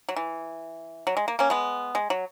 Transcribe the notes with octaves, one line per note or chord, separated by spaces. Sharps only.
F#3
E3
F#3
G#3
A#3
A#3 C#4
G#3 B3
G#3
F#3